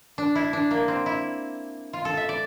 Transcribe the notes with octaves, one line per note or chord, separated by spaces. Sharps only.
D4
E4
D4
A#3
C4
E4
F4
A4
E5
D5